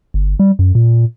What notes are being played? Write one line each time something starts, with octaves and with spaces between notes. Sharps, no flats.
G1
G3
F#2
A#2